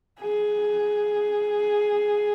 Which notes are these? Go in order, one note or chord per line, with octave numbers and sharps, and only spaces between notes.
G#4